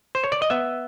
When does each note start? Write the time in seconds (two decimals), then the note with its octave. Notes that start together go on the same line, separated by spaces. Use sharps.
0.15 C5
0.24 C#5
0.32 D5
0.42 D#5
0.50 B3 E5